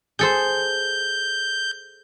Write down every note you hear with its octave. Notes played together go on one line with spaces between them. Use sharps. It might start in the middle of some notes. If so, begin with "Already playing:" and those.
G#4 A4 C5 G6